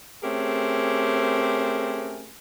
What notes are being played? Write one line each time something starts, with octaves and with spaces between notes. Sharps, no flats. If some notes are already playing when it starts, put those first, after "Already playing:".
A3 C4 C#4 G4 G#4 A#4